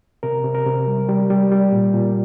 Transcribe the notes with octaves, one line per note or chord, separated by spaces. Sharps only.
C3 A#4
C3
A#4
C3
G3
G3
G3
G3
A#2
A#2